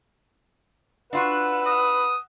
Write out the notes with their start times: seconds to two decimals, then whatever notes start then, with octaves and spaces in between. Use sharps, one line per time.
1.13 D4 F4 F#4 B4 F#5 E6
1.66 D#6